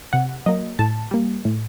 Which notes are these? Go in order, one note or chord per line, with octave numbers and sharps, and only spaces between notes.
C3 F#5
F#3 A#3 D#5
A2 A5
G3 A#3
A2